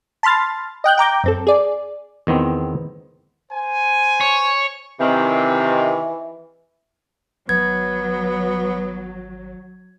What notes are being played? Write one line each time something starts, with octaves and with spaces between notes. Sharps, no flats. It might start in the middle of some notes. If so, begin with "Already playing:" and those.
A5 B5 C6 F6 A6
D#5 G5 F#6 G6
G5 A#5 D6 G6
F#2 C4 A4
G#4 D5
E2 D#3 B3 C4
C5 G#5
C#5
C3 D#3 E3 C4
G#1 F#3 B3 G#6